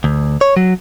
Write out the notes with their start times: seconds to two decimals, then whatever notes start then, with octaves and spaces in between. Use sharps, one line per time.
0.04 D2
0.41 C#5
0.57 F#3